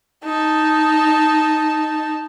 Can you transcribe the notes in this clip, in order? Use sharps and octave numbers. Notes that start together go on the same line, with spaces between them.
D#4 A5